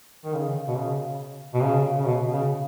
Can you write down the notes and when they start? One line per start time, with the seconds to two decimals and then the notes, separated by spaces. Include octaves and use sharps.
0.25 D#3
0.34 C#3
0.68 B2
0.78 C#3
1.54 B2
1.63 C#3
1.99 C#3
2.05 B2
2.33 C#3